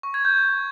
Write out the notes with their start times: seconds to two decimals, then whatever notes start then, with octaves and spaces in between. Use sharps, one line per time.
0.03 C#6
0.14 G#6
0.25 G6